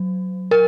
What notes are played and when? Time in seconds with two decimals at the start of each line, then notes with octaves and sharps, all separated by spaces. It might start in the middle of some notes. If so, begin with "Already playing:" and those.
Already playing: F#3
0.51 A#4